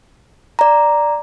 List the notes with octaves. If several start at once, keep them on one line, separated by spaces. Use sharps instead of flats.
D5 A#5